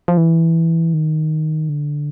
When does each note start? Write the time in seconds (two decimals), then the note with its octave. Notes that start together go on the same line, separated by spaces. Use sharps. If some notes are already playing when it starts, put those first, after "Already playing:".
0.08 F3
0.17 E3
0.94 D#3
1.69 D3